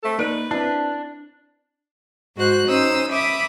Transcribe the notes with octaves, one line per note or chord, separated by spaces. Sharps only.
A3 C4 A4
A#3 D#4 B4 D5 D7
C4 D4 E4 A5
G#2 G#3 F#4 C5 F#6
C#4 D#4 C5 D#6 E6
E5 B5 D6 D#6